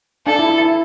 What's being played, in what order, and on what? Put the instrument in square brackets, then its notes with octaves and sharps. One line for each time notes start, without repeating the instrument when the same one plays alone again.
[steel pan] D4 [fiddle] A4
[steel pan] E4
E4
E4